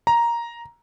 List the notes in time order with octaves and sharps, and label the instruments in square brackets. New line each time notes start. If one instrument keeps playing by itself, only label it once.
[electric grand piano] A#5